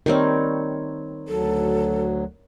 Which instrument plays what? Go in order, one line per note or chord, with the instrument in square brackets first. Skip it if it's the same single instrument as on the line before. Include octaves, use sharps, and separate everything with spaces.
[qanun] D#3 G3 C4 [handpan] A#4 C#5
[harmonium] D2 F#3 [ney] A4